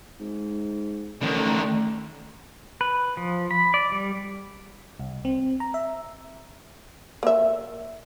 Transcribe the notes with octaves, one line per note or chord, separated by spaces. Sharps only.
G#2
A1 D3 D#3 A3
B4
F3
B5
D5
G3
C2
C4
A#5
E5
A#3 E5